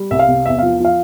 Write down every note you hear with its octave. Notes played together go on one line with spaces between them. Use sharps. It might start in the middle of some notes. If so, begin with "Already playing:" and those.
Already playing: G3
C2 E5
F5
C3
E2 E5
F3 F5
F3 F5